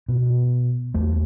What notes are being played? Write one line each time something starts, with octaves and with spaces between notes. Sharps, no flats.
B2
E2 A3